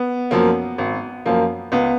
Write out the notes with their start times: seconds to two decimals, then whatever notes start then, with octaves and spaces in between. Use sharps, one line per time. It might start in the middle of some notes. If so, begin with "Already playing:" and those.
Already playing: B3
0.31 F#2 F3 A#3
0.78 G#1
1.26 F#2 F3 A#3
1.72 C#2 B3